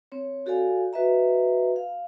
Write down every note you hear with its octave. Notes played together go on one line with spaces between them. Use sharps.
C4 C#5
F#4 G4 A4 D5 F5 G#5
F#4 B4 D#5 E5 A#5
F5